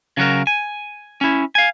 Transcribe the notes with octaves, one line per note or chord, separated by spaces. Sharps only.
C#3 F#3 F#4 A#4
G#5
C#4 E4
F5 G#5